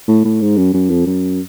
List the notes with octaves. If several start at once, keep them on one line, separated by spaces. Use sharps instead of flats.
A2
A2
G#2
F#2
F#2
F2
F#2